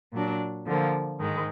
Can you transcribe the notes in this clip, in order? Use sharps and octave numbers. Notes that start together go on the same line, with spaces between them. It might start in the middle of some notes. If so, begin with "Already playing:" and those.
A#2 F#3 D4
D3 F3 A#3
G#2 D#3 G#3